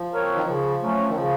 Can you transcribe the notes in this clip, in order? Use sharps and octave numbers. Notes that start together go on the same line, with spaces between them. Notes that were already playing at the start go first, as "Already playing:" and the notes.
Already playing: F3
C4 F#4 A#4 C#5
D#3
C#3 F3
F#3 A3 C#4
D#3
C#3 F3